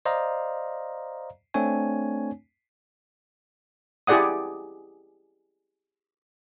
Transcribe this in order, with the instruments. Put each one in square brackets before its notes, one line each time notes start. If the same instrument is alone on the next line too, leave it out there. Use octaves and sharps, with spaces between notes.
[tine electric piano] C5 D5 D#5 F5 A#5
A3 C4 D4 C#5 G#5
[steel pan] E4 G4 G#4 D5 F#5 D#6